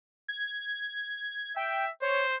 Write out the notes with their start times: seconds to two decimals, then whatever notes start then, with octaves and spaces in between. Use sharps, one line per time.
0.28 G#6
1.57 E5 G5
2.02 C5 C#5